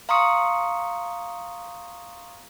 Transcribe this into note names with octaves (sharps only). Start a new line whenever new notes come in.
F5 A#5 C6 C#6 D#6 C#7